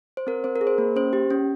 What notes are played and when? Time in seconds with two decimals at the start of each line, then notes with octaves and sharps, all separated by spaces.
0.17 C5
0.27 C4 A#4
0.44 C4 C5
0.56 A#4
0.61 G#4
0.67 C5
0.78 A#3
0.96 C#4 C5
1.13 G4
1.31 C#4